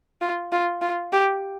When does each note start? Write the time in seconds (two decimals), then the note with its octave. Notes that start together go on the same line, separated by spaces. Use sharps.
0.21 F4
0.52 F4
0.82 F4
1.13 G4